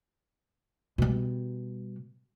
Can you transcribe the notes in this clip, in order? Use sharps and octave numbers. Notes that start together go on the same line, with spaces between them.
B2 G3